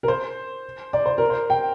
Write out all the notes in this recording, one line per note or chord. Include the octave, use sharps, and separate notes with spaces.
A#4
C5
D5
C5
A#4
C5
G5